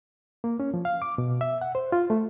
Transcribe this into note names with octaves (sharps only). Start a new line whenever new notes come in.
A#3
C#4
F3
F5
D6
B2
E5
F#5
C5
F4
A3